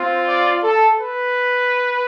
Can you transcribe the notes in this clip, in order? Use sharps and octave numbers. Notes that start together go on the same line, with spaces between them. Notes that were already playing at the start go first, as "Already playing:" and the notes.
Already playing: C4 F4
D5
A4
B4